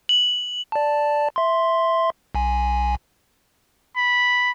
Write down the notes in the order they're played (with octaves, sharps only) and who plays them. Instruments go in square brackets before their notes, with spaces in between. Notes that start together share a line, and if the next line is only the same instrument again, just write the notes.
[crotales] F#7
[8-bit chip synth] D5 A5
E5 C6
B1 G#5
[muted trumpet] B5